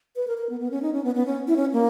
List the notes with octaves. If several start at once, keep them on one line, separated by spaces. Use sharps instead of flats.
B4
A#4
A#4
B3
B3
C#4
D#4
C#4
B3
B3
C#4
E4
C#4
A#3